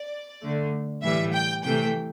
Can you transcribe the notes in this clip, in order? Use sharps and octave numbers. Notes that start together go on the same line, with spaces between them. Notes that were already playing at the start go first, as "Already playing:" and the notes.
Already playing: D5
D3 A3
A2 E3 G3 E5
G5
C3 E3 A3 G5